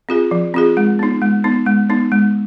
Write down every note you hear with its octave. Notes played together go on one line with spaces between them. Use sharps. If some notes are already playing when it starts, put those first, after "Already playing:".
C4 F4 G#4
F3
C4 F4 G#4
G#3
B3 D#4
G#3
B3 D#4
G#3
B3 D#4
G#3